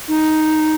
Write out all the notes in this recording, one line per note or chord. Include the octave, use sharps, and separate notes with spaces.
D#4